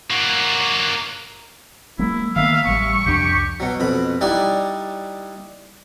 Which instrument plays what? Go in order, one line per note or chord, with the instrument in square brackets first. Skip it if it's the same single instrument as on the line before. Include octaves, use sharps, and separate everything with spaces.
[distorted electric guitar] A#3 F#4
[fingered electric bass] F#3 G#3 A#3 [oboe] E4
[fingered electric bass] D#3 A#3 B3 [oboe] E5 [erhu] F5
[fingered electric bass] A1 G3 [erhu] C#6
[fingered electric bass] C2 F2 D4 [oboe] G4
[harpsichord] B2 F#3
F2 B2 B5
G3 D#4 E4 G4 D5 F#5